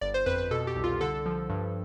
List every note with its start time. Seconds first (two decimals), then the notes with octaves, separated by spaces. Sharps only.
0.01 G1 D5
0.14 C5
0.26 F2 B4
0.38 B4
0.51 B2 A4
0.67 G4
0.76 C2
0.84 F4
1.01 D3 A4
1.26 F3
1.49 G2